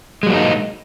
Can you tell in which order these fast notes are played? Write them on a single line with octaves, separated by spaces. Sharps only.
G#3 F#3 A#3 D#4